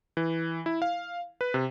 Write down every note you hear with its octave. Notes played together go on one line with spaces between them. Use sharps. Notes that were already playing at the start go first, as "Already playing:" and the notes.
E3
E4
F5
B4
C3